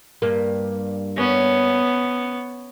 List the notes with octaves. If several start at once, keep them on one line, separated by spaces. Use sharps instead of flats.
G2 A#3
B3 C#4